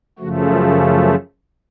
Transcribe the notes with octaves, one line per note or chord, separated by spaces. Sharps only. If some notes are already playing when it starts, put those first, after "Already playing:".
F#2 C#3 F3 A3 F#4
F4